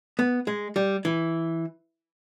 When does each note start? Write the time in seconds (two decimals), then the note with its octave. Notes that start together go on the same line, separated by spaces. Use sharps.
0.19 B3
0.47 G#3
0.76 G3
1.05 E3